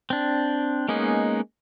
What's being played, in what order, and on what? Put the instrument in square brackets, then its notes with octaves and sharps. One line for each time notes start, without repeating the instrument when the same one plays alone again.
[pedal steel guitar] C4 D4
G#3 A#3 B3 C#4 D#4